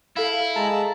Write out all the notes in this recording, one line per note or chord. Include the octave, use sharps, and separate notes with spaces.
E4 A4 F5
G#3 A5 A#5